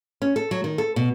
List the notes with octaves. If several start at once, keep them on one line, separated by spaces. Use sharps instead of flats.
C#4
A4
F#3
D#3
A4
B2